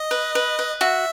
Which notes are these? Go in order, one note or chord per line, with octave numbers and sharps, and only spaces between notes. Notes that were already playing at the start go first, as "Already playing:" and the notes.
Already playing: D#5
B4
B4
B4
F#4 E5